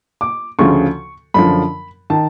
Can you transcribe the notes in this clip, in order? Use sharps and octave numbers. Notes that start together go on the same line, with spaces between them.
D6
D2 C#3 F3 C#6
F#2 D3 F3 B5
D#3 A5